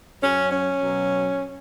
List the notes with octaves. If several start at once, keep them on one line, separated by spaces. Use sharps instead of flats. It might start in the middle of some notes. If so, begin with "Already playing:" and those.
F#2 F#3 C#4
C#4
B2 F#3